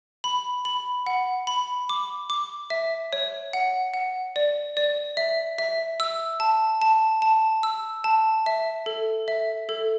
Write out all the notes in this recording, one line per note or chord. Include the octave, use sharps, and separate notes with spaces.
B5
B5
F#5
B5
D6
D6
E5
C#5
F#5
F#5
D5
D5
E5
E5
E6
A5
A5
A5
E6
A5
E5
A4
E5
A4